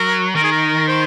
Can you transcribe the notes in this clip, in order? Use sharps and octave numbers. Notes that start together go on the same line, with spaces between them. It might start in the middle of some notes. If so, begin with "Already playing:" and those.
Already playing: F#3 A#4
D#3 A#4
G#4
A#4
C5